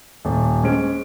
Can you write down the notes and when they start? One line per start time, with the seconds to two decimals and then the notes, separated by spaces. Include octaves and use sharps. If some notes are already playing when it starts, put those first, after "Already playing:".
0.25 D#1
0.63 G#3 C#4 C5 D7